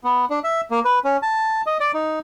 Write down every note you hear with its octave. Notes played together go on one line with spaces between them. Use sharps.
B3
D4
E5
A#3
B4
C#4
A5
D#5
D5
D#4